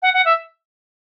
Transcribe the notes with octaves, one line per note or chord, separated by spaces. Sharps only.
F#5
F#5
E5